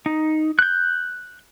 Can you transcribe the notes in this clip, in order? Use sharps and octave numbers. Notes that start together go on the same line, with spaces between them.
D#4
F#6 G6